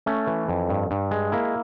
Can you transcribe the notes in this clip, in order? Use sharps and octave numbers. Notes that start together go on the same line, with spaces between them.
A3 C#4
E3
F2
G2
G2
G#3
A#3 E4